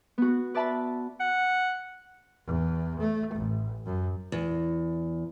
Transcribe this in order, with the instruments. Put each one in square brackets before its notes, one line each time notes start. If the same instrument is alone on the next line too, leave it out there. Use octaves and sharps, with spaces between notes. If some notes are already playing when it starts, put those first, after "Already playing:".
[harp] B3 F#4
B4 D5 E5 A5 B5
[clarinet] F#5
[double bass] E2
A3
A1
F#2
[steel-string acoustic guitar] E2